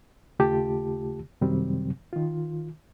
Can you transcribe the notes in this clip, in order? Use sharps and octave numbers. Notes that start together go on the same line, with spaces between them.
D#2 C#3 A3 F4 G4 A5
F#2 C3 D#3 F#3 G3 C4
D#3 F4